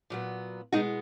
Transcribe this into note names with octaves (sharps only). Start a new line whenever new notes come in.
A#2 F#3 B3
B2 G#3 B3 D#4 F#4